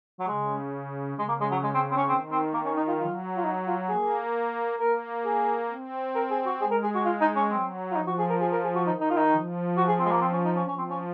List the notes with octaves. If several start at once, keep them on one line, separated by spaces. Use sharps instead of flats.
F#3
C#3 G#3
C#3 G#3
A#3
G#3
F#3
G#3
C4
C4
C#4
D#3 C4
C4
A#3
C#4
D#4
F4
F#3 F4
F4
D#4
F4
A#3 G#4
A#3 A#4
G#4
C4
A#4
G#4
F#4
G#3 G#4
A#4
G#4
F#4
F4
D#4
C#4
F#3 C4
F4
F3 D#4
F#4
G#4
A#4
G#4
A#4
G#4
F#4
D#3 D#4
D#4
F4
D#4
F3
F#4
G#4
C4
G#3
A#3
C4
C#4
D#4
C#4
F3 C#4
C4
C#4